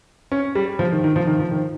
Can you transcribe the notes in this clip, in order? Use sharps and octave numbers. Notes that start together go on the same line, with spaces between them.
C#4
G3
F3
D#3
D#3
F3
D#3
F3
D#3